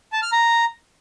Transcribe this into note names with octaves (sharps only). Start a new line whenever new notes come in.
A5
F6
A#5